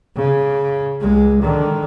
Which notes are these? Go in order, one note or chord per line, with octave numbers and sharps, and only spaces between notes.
C#3
C#2 G#3
D3 D#3